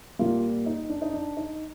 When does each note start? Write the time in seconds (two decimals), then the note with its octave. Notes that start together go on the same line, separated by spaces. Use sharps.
0.19 A#2 G3 A#3 F4
0.66 D#4
0.89 D4
1.02 D#4
1.13 D4
1.37 D#4